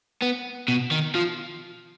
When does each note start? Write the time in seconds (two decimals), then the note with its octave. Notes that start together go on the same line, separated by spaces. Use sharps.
0.22 B3
0.68 B2
0.91 D#3
1.15 F3